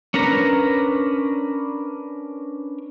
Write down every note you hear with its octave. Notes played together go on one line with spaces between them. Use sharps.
C#4 D4 A#4 B4 A#5